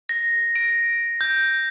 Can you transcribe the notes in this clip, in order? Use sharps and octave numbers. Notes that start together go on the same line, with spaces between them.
A#6
D7
G6